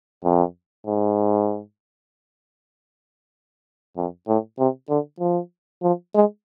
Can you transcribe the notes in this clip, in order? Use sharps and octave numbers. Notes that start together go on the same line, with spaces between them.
F2
G#2
F2
A2
C3
D3
F3
F3
G#3